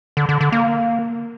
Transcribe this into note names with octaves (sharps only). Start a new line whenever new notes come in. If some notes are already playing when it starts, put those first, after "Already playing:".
D3
D3
D3
A#3